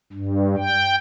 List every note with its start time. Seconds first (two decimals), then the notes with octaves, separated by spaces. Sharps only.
0.13 G2
0.57 G5